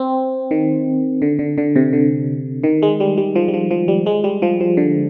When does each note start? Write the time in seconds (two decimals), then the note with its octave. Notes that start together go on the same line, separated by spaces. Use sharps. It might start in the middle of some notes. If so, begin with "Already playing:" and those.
Already playing: C4
0.51 D#3
1.22 D3
1.39 D3
1.58 D3
1.76 C3
1.93 D3
2.64 D#3
2.82 G#3
3.00 G3
3.17 G3
3.35 F3
3.48 G3
3.54 F3
3.71 F3
3.88 G3
4.06 G#3
4.24 G3
4.42 F3
4.60 F3
4.77 D3